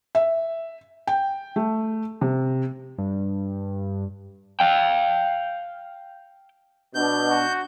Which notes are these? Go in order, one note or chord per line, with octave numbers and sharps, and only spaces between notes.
E5
G5
A3
C3
G2
F5 G5
B2 D4 G6
F#4